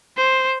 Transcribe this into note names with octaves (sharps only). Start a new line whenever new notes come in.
C5